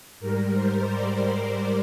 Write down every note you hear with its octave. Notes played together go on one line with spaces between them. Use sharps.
G#2 G3 A#4
C5
D5